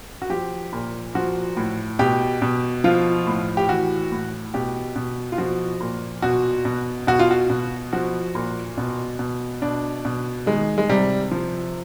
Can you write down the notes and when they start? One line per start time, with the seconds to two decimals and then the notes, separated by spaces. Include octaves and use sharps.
0.22 F#4
0.30 F3 G4
0.73 A#2
1.15 F3 F#4
1.57 A2
1.99 B2 G4
2.42 B2
2.84 F3 F4
3.27 A2
3.57 G4
3.69 E3 F#4
4.12 A2
4.54 B2 G4
4.96 B2
5.32 F4
5.38 F3 F#4
5.80 A#2
6.22 B2 F#4
6.65 B2
7.07 B2 F#4
7.19 F4
7.31 F#4
7.50 B2
7.93 F3 F#4
8.35 A#2
8.77 B2
9.19 B2
9.62 B2 D4
10.05 B2
10.46 D#3 G#3
10.78 G#3
10.89 C3 G3
11.31 F3